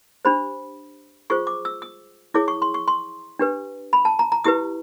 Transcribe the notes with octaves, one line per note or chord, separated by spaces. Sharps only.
D4 G4 C5 B5
F4 G#4 C5 C#6
D6
E6
D#6
E4 G#4 C#5 D6
C#6
C6
C#6
C6
D4 G4 B4
B5
A5
A#5
A#5
E4 G4 B4 D#6